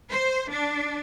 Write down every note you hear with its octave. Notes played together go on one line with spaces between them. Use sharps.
C5
D4